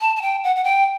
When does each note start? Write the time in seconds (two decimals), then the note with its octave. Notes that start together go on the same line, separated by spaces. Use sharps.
0.01 A5
0.16 A5
0.22 G5
0.44 F#5
0.56 F#5
0.64 G5